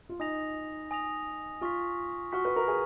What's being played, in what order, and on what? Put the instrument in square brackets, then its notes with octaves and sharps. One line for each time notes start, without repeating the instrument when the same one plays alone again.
[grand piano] F4
[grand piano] D#4 [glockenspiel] G#5 D#6 A#6 F7
[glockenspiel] G#5 D#6 A#6 F7
[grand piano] F4 [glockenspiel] G#5 C#6 F6 B6
[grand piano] F#4 [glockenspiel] G#5 C#6 F6 B6
[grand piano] B4
A#4
G#4